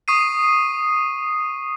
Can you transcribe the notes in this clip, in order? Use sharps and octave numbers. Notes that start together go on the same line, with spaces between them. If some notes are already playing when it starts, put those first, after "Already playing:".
C#6 D#6 C7 D#7